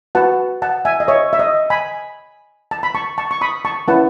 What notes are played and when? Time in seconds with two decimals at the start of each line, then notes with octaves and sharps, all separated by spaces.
0.15 F#4 B4 F#5 A5
0.62 F#5 A5
0.85 E5 G#5
1.00 D#5
1.08 C#5 E5
1.33 E5
1.39 D#5
1.70 G#5 B5
2.71 A5
2.83 B5
2.95 A5 C#6
3.18 A5 C#6
3.31 C#6
3.41 B5 D#6
3.65 A5 C#6
3.88 C#4 E4 B4 F#5 A5